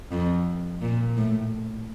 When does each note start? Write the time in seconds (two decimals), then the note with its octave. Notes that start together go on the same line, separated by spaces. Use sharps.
0.11 F2
0.81 A#2
1.16 A2